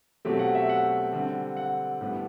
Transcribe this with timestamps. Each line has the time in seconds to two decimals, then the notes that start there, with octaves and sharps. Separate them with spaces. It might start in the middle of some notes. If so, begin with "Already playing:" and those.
0.25 B2 F#3 A3 C4 G4
0.39 F#5
0.55 E5
0.69 F#5
1.13 D3 G3 C4
1.57 F#5
2.01 A2 G3 B3